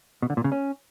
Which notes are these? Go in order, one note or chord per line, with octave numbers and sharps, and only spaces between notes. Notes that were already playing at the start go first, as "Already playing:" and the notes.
B2
D3
A#2
C#3
C#4